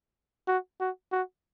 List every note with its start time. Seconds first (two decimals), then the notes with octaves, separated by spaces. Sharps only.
0.48 F#4
0.80 F#4
1.12 F#4